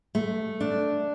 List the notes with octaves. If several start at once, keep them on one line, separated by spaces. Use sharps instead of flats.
A3
D4